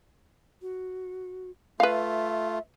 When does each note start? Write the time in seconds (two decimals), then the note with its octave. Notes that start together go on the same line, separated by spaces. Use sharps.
0.61 F#4
1.80 A3 F4 B4 E5 F5